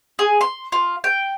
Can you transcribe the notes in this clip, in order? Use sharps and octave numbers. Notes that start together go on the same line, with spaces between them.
G#4
C6
F4
G5